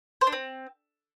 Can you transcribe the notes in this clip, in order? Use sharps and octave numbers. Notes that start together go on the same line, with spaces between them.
C5
D4
C4